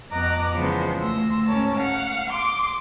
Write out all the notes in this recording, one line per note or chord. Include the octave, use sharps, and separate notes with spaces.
F2 B3 D#5 A#5 D6 F#6
C#3 E3 F3 G#3 B3 C5
D2 A3 C6 E6 A#6
G#2 C#4 A#4 C#5 A5
F5 F#5 F6
C6 D6 D#6